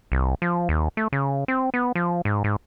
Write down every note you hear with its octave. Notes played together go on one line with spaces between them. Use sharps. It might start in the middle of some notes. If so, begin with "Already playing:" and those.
C2
F3
D#2
A3
C#3
C4
B3
F3
G#2
G#2